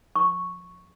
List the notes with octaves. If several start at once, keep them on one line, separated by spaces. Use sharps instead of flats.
C#6